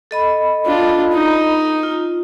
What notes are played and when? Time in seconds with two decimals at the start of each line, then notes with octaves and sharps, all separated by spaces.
0.11 A4 D#5 B5
0.65 D4 F4
1.13 D#4
1.83 F4